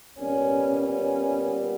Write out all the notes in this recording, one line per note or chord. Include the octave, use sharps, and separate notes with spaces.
A#2 G3 B3 C#4
C#4